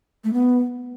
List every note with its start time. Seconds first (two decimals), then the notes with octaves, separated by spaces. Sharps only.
0.24 A3
0.33 B3